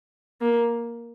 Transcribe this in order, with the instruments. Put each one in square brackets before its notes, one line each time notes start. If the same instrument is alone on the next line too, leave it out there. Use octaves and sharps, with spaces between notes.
[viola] A#3